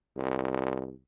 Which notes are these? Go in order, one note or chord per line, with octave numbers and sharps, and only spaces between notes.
C2